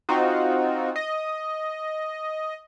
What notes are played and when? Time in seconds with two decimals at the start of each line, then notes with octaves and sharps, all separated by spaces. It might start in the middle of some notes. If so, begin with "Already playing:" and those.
0.09 C4 D#4 F4 F#4
0.96 D#5